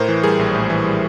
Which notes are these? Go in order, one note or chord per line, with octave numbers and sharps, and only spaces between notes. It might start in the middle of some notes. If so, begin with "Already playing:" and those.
Already playing: A2 A#4 C5
E3
G3 G#4 A#4
A#1
A2
E3
G3